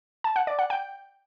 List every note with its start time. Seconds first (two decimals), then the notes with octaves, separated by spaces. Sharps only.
0.24 A5
0.36 F#5
0.47 D5
0.59 F#5
0.70 G5